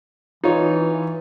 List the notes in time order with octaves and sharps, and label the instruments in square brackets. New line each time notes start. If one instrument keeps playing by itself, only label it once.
[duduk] E3 [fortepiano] D#4 F4 C#5